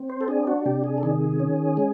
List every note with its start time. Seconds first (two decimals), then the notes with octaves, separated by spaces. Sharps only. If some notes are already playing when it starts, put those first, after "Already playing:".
Already playing: C4
0.10 C5
0.21 A4
0.28 D4 G#4
0.47 F#4
0.65 C3 G4
0.84 G#4
0.98 A4
1.03 D#3 G#4
1.40 C#4
1.77 G#3